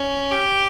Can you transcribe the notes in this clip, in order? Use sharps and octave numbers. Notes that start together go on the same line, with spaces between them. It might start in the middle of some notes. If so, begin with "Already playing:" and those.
Already playing: C#4
G4